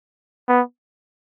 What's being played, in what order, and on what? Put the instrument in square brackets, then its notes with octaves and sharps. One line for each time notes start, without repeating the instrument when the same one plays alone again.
[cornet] B3